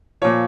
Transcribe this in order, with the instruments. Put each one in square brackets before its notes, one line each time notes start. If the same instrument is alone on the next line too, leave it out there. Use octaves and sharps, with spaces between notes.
[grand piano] A#2 F3 C#5